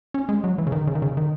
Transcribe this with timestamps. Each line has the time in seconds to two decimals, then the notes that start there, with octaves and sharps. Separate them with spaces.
0.14 C#4
0.29 G#3
0.44 F#3
0.58 E3
0.67 C#3
0.72 D#3
0.87 C#3
0.95 D#3
1.02 C#3
1.17 D#3